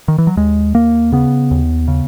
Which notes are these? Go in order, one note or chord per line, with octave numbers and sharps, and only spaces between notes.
D#3
E3
F#3
D#2 G#3
D#2 A#3
C#3 B3
D#2
C#3